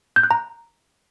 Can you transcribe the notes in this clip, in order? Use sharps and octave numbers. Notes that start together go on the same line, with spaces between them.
G6
F#6
A#5